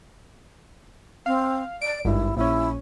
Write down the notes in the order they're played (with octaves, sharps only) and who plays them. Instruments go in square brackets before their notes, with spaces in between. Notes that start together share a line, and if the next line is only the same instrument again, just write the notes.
[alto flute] C4 [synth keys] F5
[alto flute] D5 [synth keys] D7
[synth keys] G#1 G2 [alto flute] E4
[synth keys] A#1 C#4 [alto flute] E4